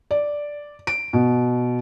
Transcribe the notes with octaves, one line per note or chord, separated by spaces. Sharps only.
D5
D7
B2